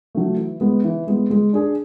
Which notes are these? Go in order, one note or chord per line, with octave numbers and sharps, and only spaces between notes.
F#3 A3
E3
G#3 B3
E3
G#3 B3
G#3
D4 G#4